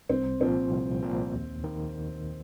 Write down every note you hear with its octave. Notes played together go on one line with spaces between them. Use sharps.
C2 C4
A#2 F3 C4
C2
A#2 F3
D#2
D#3